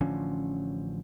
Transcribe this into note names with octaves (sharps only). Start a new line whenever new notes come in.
A1 D3 F3 C#4